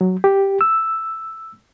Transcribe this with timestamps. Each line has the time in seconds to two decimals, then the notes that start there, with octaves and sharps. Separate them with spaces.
0.01 F#3
0.24 G4
0.61 E6